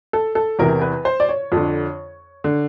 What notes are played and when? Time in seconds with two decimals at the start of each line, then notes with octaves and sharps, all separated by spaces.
0.13 A4
0.35 A4
0.59 E2 C3 E3 A#4
0.82 B4
1.05 C5
1.20 D5
1.29 C#5
1.52 F2 D3
2.44 D3